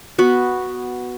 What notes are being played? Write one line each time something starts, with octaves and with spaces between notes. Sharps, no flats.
B3 F#4